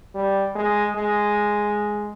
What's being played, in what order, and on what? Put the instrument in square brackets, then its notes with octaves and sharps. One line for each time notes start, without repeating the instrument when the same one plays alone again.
[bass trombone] G3
G#3
G#3